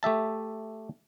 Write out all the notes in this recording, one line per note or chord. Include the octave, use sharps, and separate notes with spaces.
A3 G4 E5 A5